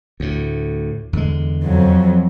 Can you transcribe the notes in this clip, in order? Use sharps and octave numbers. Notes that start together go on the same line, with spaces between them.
D2 A2
E2 D3 G#3
F2 F#3